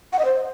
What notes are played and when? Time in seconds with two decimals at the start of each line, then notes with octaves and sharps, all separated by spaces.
0.13 F#5
0.19 D#5
0.25 C5